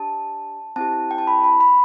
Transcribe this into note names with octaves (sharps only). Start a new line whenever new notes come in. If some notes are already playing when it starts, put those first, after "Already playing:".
Already playing: D4 G4 A5
C4 E4 G4 A5
G5
A5
B5
B5
B5